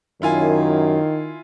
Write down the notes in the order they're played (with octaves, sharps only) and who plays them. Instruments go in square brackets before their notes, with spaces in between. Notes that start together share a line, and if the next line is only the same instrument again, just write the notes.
[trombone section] F#2 [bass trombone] D#3 [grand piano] E4 F4 G#5